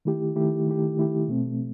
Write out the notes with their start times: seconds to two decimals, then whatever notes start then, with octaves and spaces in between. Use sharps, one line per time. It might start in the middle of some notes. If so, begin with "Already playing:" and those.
0.05 D#3 A3 E4 G4
0.36 D#3 A3 E4 G4
0.66 D#3 A3 E4 G4
0.97 D#3 A3 E4 G4
1.28 B2 A3 C4